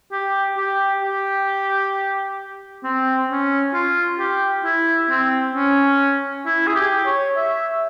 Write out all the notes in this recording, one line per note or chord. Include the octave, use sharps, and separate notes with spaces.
G4
G4
G4
C4
C#4
F4
G4
E4
C4
C#4
E4
G#4
G4
C#5
E5